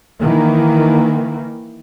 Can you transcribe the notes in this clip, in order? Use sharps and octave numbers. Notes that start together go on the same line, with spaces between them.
D#3 E3 A#3